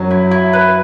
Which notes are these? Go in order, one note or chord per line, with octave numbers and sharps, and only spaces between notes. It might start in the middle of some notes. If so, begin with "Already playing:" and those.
Already playing: F#2 F#3
E4
E4
B4